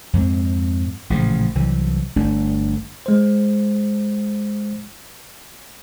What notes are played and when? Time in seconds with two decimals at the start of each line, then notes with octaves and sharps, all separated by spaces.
0.13 F2 G#2 A3 C4
1.10 A1 A#2 C#3 F3
1.55 C2 E3 F#3
2.16 G1 A3 D4
3.06 G#3 C5